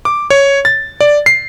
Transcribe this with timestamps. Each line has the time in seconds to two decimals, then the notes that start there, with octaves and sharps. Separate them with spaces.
0.05 D6
0.30 C#5
0.65 A6
1.01 D5
1.26 C7